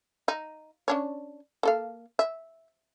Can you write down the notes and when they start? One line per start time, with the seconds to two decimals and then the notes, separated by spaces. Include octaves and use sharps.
0.28 D#4
0.88 C#4 D4 C#5
1.63 A#3 A4 F5
2.19 E5